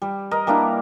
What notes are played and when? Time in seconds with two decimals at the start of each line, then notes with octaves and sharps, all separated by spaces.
0.02 G3
0.31 A#4 D#5
0.47 G3 A#3 D4 E4